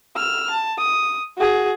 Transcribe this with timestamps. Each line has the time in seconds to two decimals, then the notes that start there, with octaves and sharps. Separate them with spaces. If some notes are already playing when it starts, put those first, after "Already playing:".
0.16 E6 F6
0.50 A5
0.78 D#6
1.38 F#4 G#4